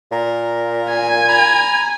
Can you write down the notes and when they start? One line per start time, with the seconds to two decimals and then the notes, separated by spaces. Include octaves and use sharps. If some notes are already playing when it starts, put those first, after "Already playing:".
0.12 A#2 A#4
0.90 G#5
1.28 A#5 B5